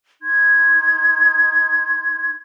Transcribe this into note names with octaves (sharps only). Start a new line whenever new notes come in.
D#4 C6 G#6